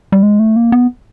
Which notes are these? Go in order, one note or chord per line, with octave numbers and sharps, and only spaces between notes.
G3
G#3
A3
A#3
B3